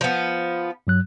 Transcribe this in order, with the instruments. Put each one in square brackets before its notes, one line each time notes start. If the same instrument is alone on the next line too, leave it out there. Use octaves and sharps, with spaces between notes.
[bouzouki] F3 B3
[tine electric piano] G2 F#3 F#6